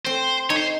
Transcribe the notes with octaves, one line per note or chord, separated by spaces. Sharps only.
C4 C5
D#4 C#5
C5